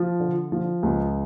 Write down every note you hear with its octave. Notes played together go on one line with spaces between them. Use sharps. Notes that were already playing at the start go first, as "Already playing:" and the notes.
Already playing: F3
D3
F3
C#2